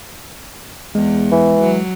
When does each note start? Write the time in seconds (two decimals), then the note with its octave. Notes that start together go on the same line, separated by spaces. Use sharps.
0.95 E2 G#3
1.32 E3
1.61 F#3